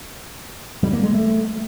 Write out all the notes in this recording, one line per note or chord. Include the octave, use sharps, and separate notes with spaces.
G3
A#3
G#3
A3